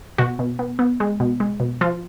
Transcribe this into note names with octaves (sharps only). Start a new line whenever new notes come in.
B2 F#4
B2
B3
B3
G#3
B2
G#3
B2
F3 F4